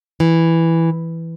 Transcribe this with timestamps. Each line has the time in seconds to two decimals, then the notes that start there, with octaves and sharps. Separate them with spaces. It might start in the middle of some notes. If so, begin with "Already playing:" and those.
0.20 E3